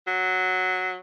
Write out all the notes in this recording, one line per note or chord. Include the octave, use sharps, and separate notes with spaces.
F#3